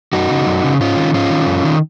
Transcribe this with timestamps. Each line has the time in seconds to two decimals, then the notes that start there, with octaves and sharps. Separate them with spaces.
0.13 F#2 D#4 F#4
0.30 C#3
0.46 F#2
0.64 C#3
0.81 G#2 C#4 F4
0.97 D#3
1.14 G#2 C#4 F4
1.30 D#3
1.47 F#2
1.64 D#3